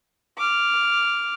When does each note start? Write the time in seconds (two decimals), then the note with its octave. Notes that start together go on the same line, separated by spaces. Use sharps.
0.38 D6 F6